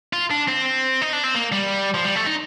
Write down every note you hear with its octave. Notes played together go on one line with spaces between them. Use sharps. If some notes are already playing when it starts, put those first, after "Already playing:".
F4
D4
C4
D#4
D4
C4
A#3
G3
F3
G3
A3
D#4